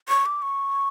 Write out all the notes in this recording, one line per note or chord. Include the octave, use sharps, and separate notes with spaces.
C#6
D6
C#6